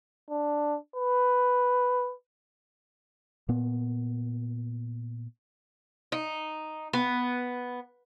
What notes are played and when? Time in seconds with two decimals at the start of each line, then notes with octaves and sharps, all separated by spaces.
0.30 D4
0.96 B4
3.49 A#2 B3
6.12 D#4
6.93 B3